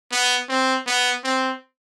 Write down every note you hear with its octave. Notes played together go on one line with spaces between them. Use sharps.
B3
C4
B3
C4